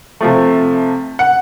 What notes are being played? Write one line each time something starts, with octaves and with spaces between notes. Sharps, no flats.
C3 F3 A3
F#5